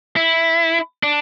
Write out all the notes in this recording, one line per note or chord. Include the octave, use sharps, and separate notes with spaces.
E4
D4